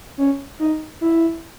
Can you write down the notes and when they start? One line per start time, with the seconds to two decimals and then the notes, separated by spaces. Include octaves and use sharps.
0.18 C#4
0.59 D#4
1.01 E4